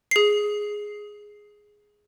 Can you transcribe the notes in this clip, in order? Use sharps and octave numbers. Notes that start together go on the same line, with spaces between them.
G#4 C7